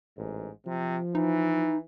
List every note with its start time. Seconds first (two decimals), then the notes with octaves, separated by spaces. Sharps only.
0.17 A1 G#2
0.67 C3 F3
1.15 E3 D#4